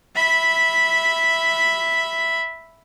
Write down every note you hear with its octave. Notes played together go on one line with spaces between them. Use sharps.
E5 B5